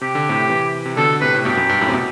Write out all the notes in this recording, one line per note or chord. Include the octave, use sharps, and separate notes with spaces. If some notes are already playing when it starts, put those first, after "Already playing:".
C3 G4
D3
A2 C3
C3 E3
C3
B2 D3 A4
A2 C3 B4
A2
G2 B2 G4
F#2
G2
F#2 A2
C3
B2